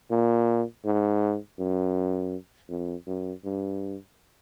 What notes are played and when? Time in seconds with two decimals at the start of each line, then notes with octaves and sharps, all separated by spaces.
0.11 A#2
0.85 G#2
1.59 F#2
2.70 F2
3.07 F#2
3.45 G2